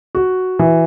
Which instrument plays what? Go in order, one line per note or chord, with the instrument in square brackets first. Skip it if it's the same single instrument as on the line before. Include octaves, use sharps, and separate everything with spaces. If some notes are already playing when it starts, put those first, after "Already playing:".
[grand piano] F#4
E3